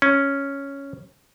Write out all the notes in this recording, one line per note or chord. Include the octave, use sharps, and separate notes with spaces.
C#4